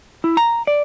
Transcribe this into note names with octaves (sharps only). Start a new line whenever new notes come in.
E4
A#5
D5